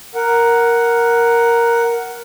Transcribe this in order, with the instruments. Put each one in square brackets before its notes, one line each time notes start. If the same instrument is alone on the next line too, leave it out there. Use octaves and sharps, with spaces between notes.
[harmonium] A#4 F#5